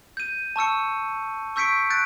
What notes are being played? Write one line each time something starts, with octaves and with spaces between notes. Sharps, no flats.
G6 D#7
A5 C#6 E6 C#7
C#6 E6 G6 B6 C#7 D7
F#6 G6 A6 D7